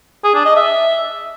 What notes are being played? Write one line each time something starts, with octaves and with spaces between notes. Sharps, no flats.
G#4
D4
D#5
E5